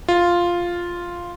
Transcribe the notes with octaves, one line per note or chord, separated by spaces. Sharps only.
F4